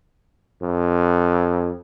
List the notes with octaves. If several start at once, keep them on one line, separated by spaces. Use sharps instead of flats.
F2